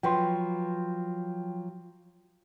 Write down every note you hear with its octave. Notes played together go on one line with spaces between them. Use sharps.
F3 F#3 B4 G5 C6